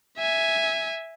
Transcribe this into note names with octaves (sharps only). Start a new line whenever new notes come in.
E5 G#5